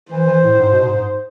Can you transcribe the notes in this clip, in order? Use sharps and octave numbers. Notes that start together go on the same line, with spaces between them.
E3 C5
E3
A2
G#2
B2
G#2
G#2